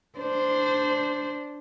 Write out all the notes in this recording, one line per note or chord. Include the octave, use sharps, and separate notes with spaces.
D4 C5